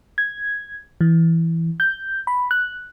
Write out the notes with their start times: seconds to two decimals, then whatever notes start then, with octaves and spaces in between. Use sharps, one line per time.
0.18 G#6
1.01 E3
1.80 G6
2.27 B5
2.51 F#6